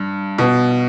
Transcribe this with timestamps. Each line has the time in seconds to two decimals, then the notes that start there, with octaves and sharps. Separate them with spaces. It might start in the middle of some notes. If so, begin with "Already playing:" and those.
Already playing: G2
0.38 B2